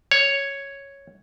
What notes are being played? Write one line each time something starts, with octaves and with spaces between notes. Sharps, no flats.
C#5